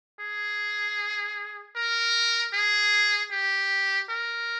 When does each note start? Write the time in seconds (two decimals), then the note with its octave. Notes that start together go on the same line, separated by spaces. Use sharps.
0.20 G#4
1.76 A#4
2.53 G#4
3.32 G4
4.09 A#4